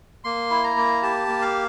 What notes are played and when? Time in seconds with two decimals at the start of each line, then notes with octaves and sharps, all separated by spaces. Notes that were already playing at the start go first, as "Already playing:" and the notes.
0.24 A#3 C6
0.50 E4
0.64 A#5
0.76 A#3
1.02 G4 A5
1.28 A#3
1.42 F5